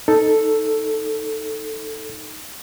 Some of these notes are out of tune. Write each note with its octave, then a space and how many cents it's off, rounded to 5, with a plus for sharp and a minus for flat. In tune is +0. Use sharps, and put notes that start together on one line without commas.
D#4 +0 A4 +0